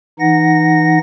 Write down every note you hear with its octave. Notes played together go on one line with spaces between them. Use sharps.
E3 D#4 F#5 A#6